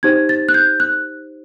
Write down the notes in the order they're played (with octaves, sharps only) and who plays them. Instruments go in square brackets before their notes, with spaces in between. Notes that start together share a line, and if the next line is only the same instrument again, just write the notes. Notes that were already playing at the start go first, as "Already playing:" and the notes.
[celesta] D#4 G4 C5 G#6
A6
F#6
G6
F#6